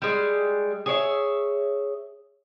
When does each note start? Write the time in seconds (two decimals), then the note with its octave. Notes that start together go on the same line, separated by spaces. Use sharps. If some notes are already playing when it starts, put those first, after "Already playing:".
0.02 G3 G#3
0.86 G#4 C#5 D5 E5